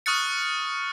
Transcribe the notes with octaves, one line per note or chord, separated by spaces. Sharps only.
C#6 D#6 F6 F#6 A6 C#7